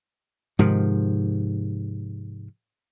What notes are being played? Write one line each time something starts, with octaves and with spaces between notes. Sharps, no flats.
G#2 C3 D#3 F3